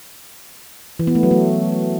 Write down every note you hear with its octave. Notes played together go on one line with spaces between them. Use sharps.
E3
B3
A3
F#3
A3